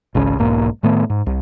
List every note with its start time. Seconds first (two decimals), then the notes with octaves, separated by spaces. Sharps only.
0.15 G#1 C#2 C#3 C#4
0.39 E1 B1 G#2 A#3
0.83 A2 D#3 A3 B3
1.10 G#2
1.26 C2